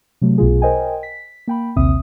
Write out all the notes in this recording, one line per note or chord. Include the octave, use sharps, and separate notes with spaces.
C3 F#3 A3
B1 B2 F4 G#4
A#4 C5 D#5 G5 G#5
B6
A#3 G5 B5
A#1 D#2 C3 C4 E5 D#6